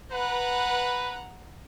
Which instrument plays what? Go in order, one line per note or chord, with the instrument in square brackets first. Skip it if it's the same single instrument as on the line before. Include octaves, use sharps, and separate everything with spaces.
[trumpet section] B4 [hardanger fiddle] F#5 A#5